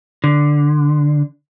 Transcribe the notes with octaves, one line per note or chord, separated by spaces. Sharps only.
D3